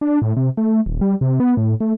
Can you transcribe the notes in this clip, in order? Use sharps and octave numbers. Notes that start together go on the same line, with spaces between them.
D4
A2
C3
A3
D#1
G3
C3
B3
A2
A3